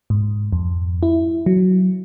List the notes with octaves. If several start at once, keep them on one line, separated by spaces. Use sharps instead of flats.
G#2
F2
E4
F#3